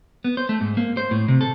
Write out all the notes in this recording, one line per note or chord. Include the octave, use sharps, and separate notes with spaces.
B3
C5
A3
G#2
A#3
C5
A2
C3
A4